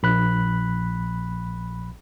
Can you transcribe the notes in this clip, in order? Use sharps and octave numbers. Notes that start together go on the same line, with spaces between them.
A#1 B5 F#6